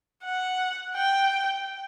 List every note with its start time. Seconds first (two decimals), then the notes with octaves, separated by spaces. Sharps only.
0.25 F#5
0.96 G5